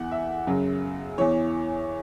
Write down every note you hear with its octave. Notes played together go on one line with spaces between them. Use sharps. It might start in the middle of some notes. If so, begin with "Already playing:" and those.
Already playing: E2 E3 F#5
E5
F#2 C#3 F#3
E2 E3 C#5